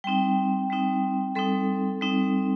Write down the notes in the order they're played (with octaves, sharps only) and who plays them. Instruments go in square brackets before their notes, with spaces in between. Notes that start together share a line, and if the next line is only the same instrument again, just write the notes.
[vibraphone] G3 C4 D#4 G5
G3 C4 D#4
G3 C4 D#4 A4
G3 C4 D#4